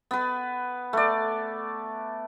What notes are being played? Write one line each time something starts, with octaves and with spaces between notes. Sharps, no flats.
B3 B4
A3 D5